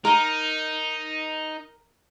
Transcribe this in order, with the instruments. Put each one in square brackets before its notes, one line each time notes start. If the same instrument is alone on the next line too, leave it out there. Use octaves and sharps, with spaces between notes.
[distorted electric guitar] D#4 [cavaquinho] A#4